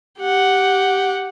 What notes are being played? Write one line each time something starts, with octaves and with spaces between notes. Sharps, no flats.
G4 F#5